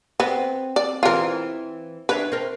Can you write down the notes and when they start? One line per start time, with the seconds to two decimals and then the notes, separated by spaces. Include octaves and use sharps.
0.20 B3 C4
0.76 D5
1.03 E3 C4 F4 A#4
2.09 D4 B4 C#5 E5
2.32 C4 A#4